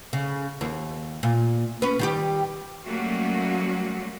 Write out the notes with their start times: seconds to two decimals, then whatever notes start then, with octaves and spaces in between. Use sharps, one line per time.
0.13 C#3
0.61 D#2
1.23 A#2
1.82 C#4 B4
1.99 D#3 G3 G4
2.86 F#3 G3 A3 A#3 C#4 F#4